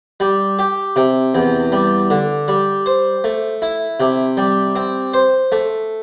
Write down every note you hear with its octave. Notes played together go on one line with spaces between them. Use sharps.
G3
G4
C3
E2
G3
D3
G3
C5
A3
E4
C3
G3
C4
C5
A3